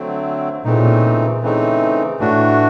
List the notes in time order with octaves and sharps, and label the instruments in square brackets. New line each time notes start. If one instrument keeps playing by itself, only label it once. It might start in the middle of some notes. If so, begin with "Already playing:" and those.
Already playing: [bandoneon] D3 F#3 A3 C4
[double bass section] A#2 [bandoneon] C#3 E3 A3 C4 D#4
[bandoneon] C#3 E3 A3 C4 D#4
[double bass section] A2 [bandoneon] E3 A3 D4 F#4